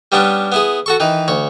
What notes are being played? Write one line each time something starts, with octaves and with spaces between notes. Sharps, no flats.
G3 B3 C#4 D4 B4
B3 E4 G#4
F#4 A4 C#6
D#3 E3 B4
D2 C#5